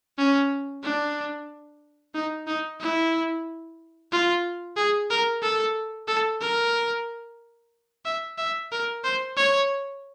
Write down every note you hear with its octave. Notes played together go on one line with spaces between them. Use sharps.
C#4
D4
D#4
D#4
E4
F4
G#4
A#4
A4
A4
A#4
E5
E5
A#4
C5
C#5